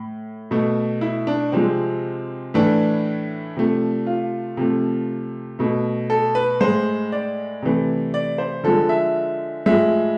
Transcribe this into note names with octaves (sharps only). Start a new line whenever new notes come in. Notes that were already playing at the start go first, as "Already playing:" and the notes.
Already playing: A2
B2 A3
E4
D4
C3 F3 G#3 C4
A2 E3 A3 D4
C3 F3 A3
F4
C3 F3 A3
B2 A3
A4
B4
A2 G#3 C5
D5
C3 E3 A3
D5
C5
D3 F3 G#3 A4
E5
A2 F3 G#3 E5